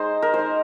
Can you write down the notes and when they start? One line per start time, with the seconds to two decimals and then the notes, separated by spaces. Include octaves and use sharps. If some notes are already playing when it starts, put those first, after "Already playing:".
Already playing: G#3 D#4 C5 D#5
0.22 A#4
0.33 G#3 C5
0.39 D#4